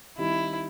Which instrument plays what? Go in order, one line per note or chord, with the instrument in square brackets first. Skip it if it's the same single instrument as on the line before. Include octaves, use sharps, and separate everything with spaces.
[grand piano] D#3 G3 C4 D#4 [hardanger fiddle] E4